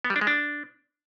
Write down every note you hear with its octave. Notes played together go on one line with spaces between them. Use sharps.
B3
G3
D4
G#3
D4